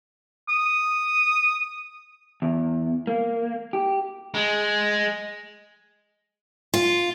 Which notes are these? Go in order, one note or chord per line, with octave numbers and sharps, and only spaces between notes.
D#6
E2
A#3
G4
G#3
F4